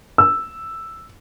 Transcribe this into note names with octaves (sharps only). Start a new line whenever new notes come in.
E6